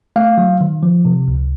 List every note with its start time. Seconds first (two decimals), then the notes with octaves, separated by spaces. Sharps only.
0.16 A3 F5
0.38 F#3
0.61 D#3
0.83 F3
1.05 C3
1.28 C#2